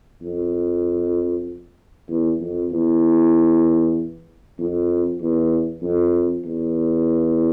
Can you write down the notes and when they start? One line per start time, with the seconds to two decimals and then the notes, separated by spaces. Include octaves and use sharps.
0.22 F2
2.09 E2
2.40 F2
2.72 E2
4.59 F2
5.20 E2
5.83 F2
6.45 E2